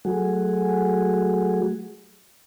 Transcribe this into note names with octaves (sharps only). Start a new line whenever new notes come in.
F#3 A3 F#4 G#4